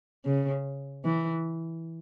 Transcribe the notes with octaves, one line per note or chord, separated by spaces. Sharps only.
C#3
E3